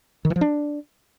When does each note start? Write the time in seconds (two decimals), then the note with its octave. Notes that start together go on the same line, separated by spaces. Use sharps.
0.25 D#3
0.30 E3
0.36 F3
0.41 D4